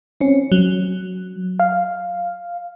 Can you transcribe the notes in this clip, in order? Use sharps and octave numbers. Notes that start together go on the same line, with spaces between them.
C4 C#4
F#3
F5